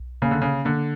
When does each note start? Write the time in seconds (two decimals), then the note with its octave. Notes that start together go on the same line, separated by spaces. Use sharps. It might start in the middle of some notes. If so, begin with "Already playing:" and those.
Already playing: B1
0.22 C#3 A#3
0.31 D3
0.42 C#3
0.65 D3 A#3